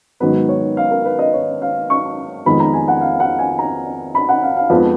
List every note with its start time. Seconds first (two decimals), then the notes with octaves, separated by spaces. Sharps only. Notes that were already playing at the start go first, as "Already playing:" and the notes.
0.20 G#2 D#3 F#3 B3 B4
0.49 C#5
0.77 F5
0.91 A#4
1.05 B4
1.19 D#5
1.33 C#5
1.62 F5
1.90 C#6
2.46 F2 D#3 G#3 B3 B5
2.60 A#5
2.74 G#5
2.88 F#5
3.01 F5
3.20 F#5
3.39 G#5
3.59 A#5
4.15 B5
4.29 F#5
4.43 F5
4.57 F5
4.70 F2 F3 G#3 B3 B4